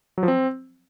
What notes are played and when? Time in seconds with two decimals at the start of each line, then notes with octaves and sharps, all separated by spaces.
0.18 F#3
0.23 F3
0.28 C4